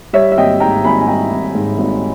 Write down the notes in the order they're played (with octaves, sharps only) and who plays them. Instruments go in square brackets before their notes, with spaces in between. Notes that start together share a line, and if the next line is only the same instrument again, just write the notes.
[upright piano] G3 C#5 E5
E5
G#1 D#5 G5
G#2 G5 A#5
G#1 G#5 B5
G#5
G3 G5 A#5
G#1
G#2
G#1